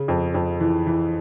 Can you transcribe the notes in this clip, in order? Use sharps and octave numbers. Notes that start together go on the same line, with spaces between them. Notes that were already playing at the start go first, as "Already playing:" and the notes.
Already playing: C#3
F2
F2
E3
E3